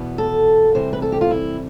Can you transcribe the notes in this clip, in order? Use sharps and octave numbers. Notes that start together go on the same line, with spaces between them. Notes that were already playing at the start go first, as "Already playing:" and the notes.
Already playing: E2 B2 B3
A4
C3 E3 G3 C5
B4
A4
G4
F4
E4